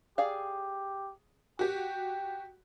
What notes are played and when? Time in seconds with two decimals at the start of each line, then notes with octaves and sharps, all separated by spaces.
0.18 G4 G#4 D5 F5
1.59 F#4 G4 G5